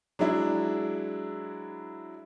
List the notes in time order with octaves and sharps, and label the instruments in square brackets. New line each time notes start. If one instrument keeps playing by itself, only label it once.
[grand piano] F#3 G#3 D4 E4